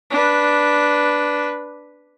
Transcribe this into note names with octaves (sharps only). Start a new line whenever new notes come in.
D4 B4